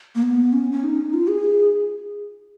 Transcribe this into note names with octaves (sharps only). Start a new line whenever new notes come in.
A#3
B3
C#4
C#4
D#4
F4
G#4